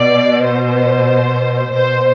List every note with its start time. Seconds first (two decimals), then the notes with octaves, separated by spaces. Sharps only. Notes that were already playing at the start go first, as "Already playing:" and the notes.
Already playing: B2 D5
0.43 C5
1.73 B2 C5